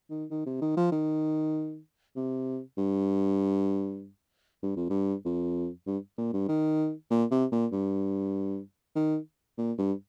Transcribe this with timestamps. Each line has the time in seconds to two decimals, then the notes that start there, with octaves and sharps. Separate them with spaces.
0.10 D#3
0.31 D#3
0.46 C3
0.62 D#3
0.77 F3
0.92 D#3
2.16 C3
2.78 G2
4.63 G2
4.77 F2
4.90 G2
5.25 F2
5.87 G2
6.18 A#2
6.33 G2
6.49 D#3
7.10 A#2
7.31 C3
7.52 A#2
7.72 G2
8.96 D#3
9.58 A#2
9.78 G2